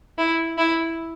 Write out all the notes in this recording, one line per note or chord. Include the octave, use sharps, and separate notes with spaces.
E4
E4